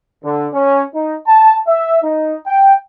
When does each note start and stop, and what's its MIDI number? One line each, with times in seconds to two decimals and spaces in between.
0.23 0.47 50
0.54 0.82 61
0.94 1.15 63
1.27 1.55 81
1.67 1.99 76
2.02 2.35 63
2.47 2.74 79